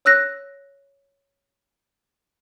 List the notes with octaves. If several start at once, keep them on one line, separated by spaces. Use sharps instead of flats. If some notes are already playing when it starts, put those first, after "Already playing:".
C#5 E6 F#6 A#6